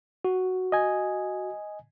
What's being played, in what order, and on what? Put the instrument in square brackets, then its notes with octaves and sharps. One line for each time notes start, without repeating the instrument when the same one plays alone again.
[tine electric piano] F#4
[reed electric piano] D#5 G#5